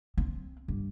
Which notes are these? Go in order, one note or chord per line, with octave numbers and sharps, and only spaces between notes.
C4
G2